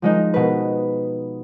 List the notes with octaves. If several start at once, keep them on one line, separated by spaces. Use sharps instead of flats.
F3 G#3 D#4
B2 B4